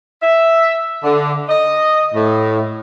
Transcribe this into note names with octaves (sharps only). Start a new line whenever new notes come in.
E5
D3
D#5
A2